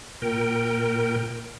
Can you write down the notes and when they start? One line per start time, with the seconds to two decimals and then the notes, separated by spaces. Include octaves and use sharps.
0.22 A#2 A#4 G5